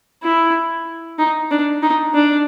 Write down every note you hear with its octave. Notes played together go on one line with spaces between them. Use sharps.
E4
D#4
D4
D#4
D4